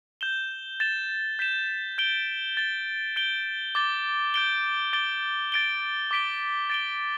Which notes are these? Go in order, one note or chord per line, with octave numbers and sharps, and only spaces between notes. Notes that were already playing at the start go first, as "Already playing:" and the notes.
G6 E7 G7
A6 E7 G7
G6 B6 E7
G6 D7 G7
A6 G7
G6 D7 G7
D6 A6 G7
G6 D7 G7
D6 A6 D7 G7
A6 D7 G7
D6 B6 D7 G7
A6 D7 G7